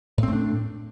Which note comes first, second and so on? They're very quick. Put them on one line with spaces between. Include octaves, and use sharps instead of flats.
A2 C4 A3 D4